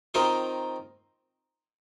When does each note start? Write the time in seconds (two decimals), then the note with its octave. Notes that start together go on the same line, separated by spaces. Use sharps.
0.14 D#3 C4 F4 A#4 D#5